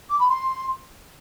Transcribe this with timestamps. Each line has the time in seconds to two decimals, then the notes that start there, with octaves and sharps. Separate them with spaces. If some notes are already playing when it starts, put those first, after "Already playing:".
0.09 D6
0.19 B5
0.29 C6